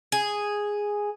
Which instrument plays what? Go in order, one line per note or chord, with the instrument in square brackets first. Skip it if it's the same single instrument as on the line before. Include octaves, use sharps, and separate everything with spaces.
[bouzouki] G#4